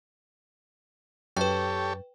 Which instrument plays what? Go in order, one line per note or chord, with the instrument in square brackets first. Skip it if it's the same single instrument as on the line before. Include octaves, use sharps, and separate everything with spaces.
[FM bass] F#2 [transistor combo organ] G4 A4 C#5 [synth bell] B4 G5